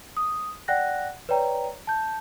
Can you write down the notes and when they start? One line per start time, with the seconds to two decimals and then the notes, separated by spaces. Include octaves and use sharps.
0.17 D#6
0.68 D5 F#5 G5 F#6 A#6
1.29 B4 C#5 D5 G5 A#5
1.87 A5 G6